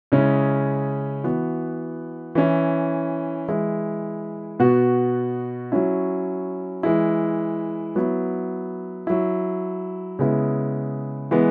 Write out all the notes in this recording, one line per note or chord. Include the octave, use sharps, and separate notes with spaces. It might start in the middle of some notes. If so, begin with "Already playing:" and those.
C#3 G#3 C#4 E4
E3 B3 F#4
E3 C#4 E4
E3 G#3 E4
B2 B3 F#4
F#3 C#4 E4
E3 G#3 E4
F#3 B3 E4
F#3 E4
C#3 G#3 B3 E4
E3 G#3 B3